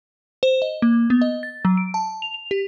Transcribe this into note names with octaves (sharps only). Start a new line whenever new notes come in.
C5
D#5
A#3
B3
D#5
A6
F#3
D7
A5
F7
F7
G4